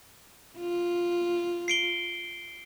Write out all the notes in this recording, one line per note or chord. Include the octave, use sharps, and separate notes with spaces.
F4
C7 D7 G7